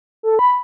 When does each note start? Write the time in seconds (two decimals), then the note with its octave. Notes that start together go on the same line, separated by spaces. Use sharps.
0.23 A4
0.39 B5